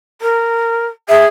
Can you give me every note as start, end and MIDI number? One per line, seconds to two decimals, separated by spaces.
0.22 0.86 70
1.09 1.26 68
1.09 1.25 76